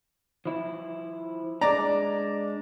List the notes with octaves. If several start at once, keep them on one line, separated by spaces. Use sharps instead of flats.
F3 E4
G#3 D4 D5 A#5